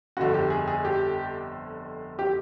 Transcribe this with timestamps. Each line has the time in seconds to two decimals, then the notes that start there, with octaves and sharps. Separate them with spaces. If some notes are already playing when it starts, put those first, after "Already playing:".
0.17 G1 F2 D3 F#4
0.34 G4
0.50 G#4
0.68 G#4
0.85 G4
2.19 G4